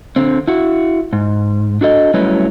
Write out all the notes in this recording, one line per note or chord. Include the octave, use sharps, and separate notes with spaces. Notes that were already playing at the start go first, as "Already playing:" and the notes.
D3 C4
E4 F#4
G#2
D4 F#4 A4 D#5
F#3 G3 A3 C#4 E4 B4